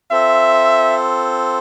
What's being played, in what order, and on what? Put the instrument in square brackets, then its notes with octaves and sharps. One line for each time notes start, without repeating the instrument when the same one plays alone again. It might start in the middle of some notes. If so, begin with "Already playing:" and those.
[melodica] C4 F4 A4 C5 [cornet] E5